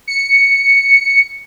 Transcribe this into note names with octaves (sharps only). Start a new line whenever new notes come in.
C#7